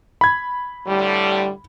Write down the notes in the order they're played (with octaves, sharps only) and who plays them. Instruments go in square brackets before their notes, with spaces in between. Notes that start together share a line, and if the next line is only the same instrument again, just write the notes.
[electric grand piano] B5 G#6
[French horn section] A2 D3 G3